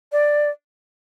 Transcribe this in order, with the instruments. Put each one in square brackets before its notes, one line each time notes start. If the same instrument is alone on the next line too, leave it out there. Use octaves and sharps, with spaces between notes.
[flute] D5